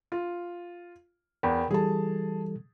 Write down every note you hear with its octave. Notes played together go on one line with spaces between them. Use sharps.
F4
E2 A#4 G5 B5
E3 G3 G#4 A4 A5